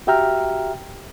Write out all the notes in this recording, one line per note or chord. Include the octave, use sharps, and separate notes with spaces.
F#4 G4 E5 G5 A#5 F6